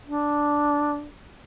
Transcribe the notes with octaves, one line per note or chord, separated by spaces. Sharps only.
D4